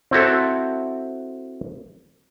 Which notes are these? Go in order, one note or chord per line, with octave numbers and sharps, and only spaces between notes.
C4 E4 F#4 A4